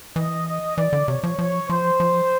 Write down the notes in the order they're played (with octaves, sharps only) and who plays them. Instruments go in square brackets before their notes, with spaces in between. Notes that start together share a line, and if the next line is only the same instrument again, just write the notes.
[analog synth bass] E3 [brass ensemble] D#5
[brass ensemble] D#5
[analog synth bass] E3 [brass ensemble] D5
[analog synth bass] D3
[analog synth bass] C3 [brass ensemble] C#5
[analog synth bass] F3
[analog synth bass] F3 [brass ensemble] C#5
[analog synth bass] F3 [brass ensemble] C5
[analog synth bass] F3